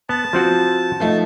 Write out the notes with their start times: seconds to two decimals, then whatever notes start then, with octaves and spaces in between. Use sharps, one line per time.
0.09 B3 A5
0.33 F3 C4 F#4
1.00 F3 A3 D#4